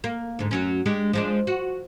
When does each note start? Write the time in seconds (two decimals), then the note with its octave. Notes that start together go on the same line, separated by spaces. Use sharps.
0.04 A#3
0.39 D2 G#2
0.51 F#2 F#3 C#4
0.86 G#3 D4 G4
1.13 F3 G#3 D4
1.47 F#4